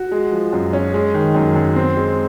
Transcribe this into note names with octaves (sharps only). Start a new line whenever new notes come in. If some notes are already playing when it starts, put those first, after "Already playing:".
Already playing: F#4
G#3
F3
F#2
C#4
G#3
D#3
F#2
F#2
C4
G#3